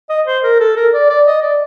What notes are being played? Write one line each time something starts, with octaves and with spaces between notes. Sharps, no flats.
D#5
C5
A#4
A4
A#4
D5
D5
D#5
D5